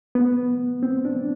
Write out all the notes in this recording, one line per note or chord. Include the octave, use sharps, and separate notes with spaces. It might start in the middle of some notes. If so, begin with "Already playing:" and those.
B3
C4
D4